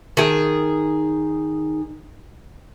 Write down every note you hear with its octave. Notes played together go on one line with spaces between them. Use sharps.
D#3 G#4